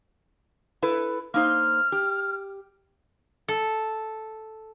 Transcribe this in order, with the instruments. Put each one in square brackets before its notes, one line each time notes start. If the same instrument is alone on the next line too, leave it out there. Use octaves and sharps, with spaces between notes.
[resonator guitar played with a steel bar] E4 A4 B4
[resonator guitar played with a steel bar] A#3 D#4 C5 [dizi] F6
[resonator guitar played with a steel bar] G4
[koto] A4